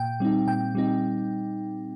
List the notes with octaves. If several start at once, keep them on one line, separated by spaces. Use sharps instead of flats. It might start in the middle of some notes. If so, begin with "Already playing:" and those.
Already playing: A#2 G5
G3 C4 D#4
A#2 G5
G3 C4 D#4